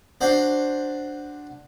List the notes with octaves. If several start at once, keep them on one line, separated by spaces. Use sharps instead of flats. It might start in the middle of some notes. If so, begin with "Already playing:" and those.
D4 F#4 C5